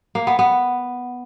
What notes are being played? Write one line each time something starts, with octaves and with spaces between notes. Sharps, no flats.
A#3
B3
B3